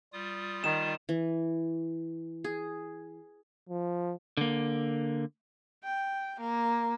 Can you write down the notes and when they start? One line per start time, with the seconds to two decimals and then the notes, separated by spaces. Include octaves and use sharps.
0.13 G3 F4 D#6
0.64 D#3 E7
1.09 E3
2.44 G#4
3.69 F3
4.37 D3 A#3
5.84 G5
6.40 A#3